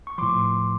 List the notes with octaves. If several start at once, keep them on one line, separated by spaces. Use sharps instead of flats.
C#6
A2 F3 C6 D6